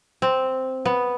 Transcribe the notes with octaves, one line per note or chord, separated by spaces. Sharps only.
C4
B3